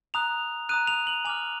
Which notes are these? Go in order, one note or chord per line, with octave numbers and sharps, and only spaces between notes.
A#5 D#6 F#6 F7
A#5 D#6 F#6 D#7
F7
F#7
G#5 D6 F6 F7